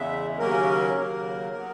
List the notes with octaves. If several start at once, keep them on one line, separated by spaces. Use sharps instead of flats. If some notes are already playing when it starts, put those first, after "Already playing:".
Already playing: E2 C#3 G#3 E5
D#2 C#3 F#3 A#3 C#4 A#4
D#2 C#3 F#3 A#3
F#3 B3